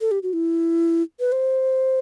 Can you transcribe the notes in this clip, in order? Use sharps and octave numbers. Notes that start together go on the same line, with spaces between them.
A4
G4
F#4
E4
B4
C5